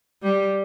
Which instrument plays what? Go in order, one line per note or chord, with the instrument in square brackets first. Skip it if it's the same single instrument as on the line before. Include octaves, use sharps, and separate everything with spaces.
[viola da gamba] G3